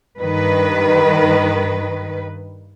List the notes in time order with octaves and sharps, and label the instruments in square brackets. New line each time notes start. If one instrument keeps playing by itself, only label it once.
[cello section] G2 D#3 B4